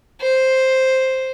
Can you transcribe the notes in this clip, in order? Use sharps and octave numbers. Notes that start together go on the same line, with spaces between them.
C5